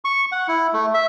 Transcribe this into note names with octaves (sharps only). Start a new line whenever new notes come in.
C#6
F#5
E4
A3
E5